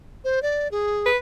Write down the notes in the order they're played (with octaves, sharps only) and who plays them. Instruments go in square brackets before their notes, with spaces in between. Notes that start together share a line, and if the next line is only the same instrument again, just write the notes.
[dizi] C5
D5
G#4
[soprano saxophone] B4